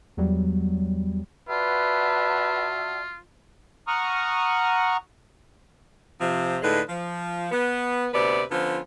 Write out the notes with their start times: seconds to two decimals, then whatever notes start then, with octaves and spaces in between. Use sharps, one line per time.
0.17 E2 F#3 G3
1.49 F4 F#4 B4 D5 E5 F#5 A5
3.88 F#5 A#5 C#6 D#6 F6
6.21 C3 F3
6.63 A2 D3 G#3 D#4 B4
6.89 F3
7.52 B3
8.14 D2 C3 B3 B4 D5
8.51 D3 F3 B3 C#4 F4